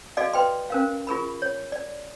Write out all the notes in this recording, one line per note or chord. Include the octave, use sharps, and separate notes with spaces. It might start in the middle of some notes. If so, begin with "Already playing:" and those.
F#4 A4 D5 D#5 F5
B4 G5 C6
C#4 A#4 F5
F4 G#4 A#4 B5
C#5
D5